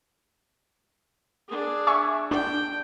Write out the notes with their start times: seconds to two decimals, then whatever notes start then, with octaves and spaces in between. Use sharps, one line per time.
1.48 D4 G#4
1.87 E5 G#5 C#6
2.31 D4 G5